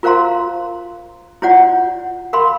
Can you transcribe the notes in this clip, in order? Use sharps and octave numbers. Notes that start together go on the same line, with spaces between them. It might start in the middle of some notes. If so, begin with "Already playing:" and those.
F4 A#4 C5 F5 A#5 C6
E4 F4 C#5 D5 F#5
A#4 F5 B5 C6